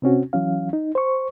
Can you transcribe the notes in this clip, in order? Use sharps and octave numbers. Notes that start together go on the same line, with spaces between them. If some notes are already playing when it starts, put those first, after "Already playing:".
C3 C4 C#4 F#4
E3 F#3 C#4 F5
D#4
C5 C#6